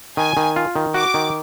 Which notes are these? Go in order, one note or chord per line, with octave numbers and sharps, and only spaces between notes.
D#3 G#5
D#3
F4
D#3
F#4 D6
D#3